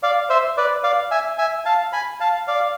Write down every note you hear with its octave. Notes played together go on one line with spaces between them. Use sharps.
D5 F5
C5 E5
B4 D5
D5 F5
E5 G#5
E5 G#5
F5 A5
G#5 B5
F5 A5
D5 F5